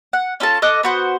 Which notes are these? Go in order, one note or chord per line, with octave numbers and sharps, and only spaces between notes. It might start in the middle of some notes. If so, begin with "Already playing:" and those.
F#5
C#4 F4 A4 A5
A4 D#5 D6 F#6
B3 F#4 C5